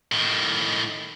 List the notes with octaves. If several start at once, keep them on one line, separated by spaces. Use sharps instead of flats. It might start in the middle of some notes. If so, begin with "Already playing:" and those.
A2 D#3